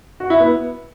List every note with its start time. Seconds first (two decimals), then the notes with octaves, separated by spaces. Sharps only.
0.20 F#4
0.30 E4
0.40 B3